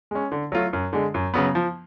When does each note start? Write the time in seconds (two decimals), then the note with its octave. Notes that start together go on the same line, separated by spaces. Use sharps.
0.11 G#3 C#4
0.32 D3
0.52 F#3 A3 F4
0.73 F#2
0.93 D3 G#3
1.14 F#2
1.34 C#3 F#3 B3
1.55 F3